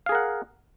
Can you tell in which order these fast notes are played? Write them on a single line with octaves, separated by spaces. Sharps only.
F5 G#4 A#4 F#5